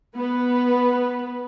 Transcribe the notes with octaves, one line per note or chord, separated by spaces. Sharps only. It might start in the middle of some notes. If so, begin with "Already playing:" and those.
B3 B4